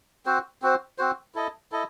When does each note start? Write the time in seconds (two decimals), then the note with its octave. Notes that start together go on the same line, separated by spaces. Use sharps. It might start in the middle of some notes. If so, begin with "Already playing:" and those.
0.26 C4 F#4 C5
0.62 C4 F#4 C5
0.98 C4 F#4 C5
1.34 E4 A4 D#5
1.72 E4 A4 D#5